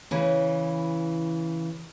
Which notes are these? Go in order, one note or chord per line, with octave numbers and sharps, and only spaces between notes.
C#3 E3